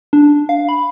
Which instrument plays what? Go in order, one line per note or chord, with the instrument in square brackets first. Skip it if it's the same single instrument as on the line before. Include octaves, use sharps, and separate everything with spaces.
[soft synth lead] D4
F5
B5